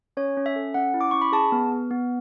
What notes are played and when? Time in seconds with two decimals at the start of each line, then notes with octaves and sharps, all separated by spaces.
0.17 C#4 C#5
0.37 C#4
0.46 E5
0.56 A4
0.74 C#4 F#5
0.94 E4
1.01 D6
1.11 C#4 C#6
1.22 B5
1.32 G#4 A5
1.52 B3
1.72 B3
1.91 B3